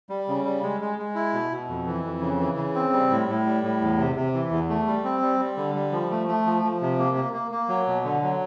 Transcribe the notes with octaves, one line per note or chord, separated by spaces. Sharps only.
G3
C#3
G3
G#3
G#3
G#3
E4
B2
B2
F2
E3
F2
C#3
E3
C#3
C4
G3
A2
A2
G3
A2
E2
C3
C3
E3
E2
A3
G3
C4
G3
G3
D3
G3
F3
A3
A3
F3
F3
C3
A#3
A#3
A#3
A#3
F#3
B2
D3
F#3